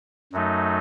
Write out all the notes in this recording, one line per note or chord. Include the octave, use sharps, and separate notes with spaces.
F#2 F#3 A3 D#4